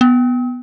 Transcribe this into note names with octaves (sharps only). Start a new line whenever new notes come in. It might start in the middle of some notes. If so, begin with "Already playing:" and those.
B3